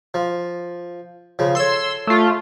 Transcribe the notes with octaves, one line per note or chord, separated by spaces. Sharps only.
F3
C#3 F3
A4 C#5 C6 E6
A3 F4